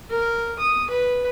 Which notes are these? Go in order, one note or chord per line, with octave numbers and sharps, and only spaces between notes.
A#4
D#6
B4